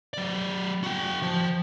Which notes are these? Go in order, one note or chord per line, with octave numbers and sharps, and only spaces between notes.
F#3 D5
F#4 G5
F3